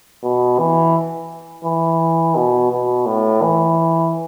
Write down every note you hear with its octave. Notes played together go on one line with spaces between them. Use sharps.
B2
E3
E3
B2
B2
A2
E3